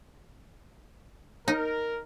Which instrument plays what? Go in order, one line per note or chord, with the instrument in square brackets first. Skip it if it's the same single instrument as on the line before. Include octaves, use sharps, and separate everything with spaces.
[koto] D#4 [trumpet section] A#4